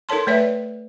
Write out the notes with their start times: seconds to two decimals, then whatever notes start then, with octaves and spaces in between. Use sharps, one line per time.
0.09 D#4 A4 A#4 C#5 A5 C6
0.27 A3 B4 C#5 D5 E5